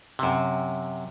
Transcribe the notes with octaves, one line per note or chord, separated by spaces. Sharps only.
F#2 C3